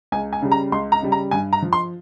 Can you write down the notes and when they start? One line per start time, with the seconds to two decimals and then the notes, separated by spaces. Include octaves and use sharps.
0.12 C#2 G#5
0.33 G#5
0.42 C#3 G3
0.52 A#5
0.72 C#2 C6
0.92 A#5
1.02 C#3 G3
1.12 A#5
1.31 G2 G#5
1.53 A#5
1.62 F3
1.73 C6